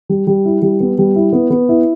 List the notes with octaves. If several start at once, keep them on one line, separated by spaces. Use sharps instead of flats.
G3
G3
E4
G3
B3
G3
E4
B3
B3
E4